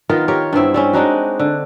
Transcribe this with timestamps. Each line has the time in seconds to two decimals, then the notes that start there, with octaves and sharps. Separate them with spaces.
0.09 D#3 B3 F4 A#4
0.28 G4 A#4 C#5
0.53 G2 B3 C4 E4
0.74 G3 C4 C#4
0.93 G#3 D4 D#4 F#4
1.39 D3